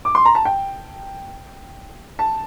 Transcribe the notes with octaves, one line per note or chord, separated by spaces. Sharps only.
D6
C6
A#5
A5
G5
A5